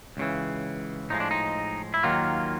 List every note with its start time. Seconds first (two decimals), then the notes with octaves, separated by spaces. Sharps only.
0.17 C#2 C#3 E3
1.10 A2 F3 G#3 D#4
1.20 D4
1.31 D#4
1.94 E4
2.03 D#2 D#3 F#3 A#3 F4